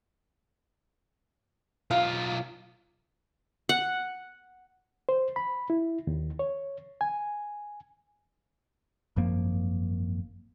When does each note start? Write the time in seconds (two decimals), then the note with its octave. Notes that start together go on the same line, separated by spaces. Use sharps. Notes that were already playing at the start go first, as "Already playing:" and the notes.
1.91 B1 F4 F5
3.69 F#5
5.09 C5
5.36 B5
5.70 E4
6.07 D#2
6.39 C#5
7.01 G#5
9.16 G#1 F#2 F3 A#3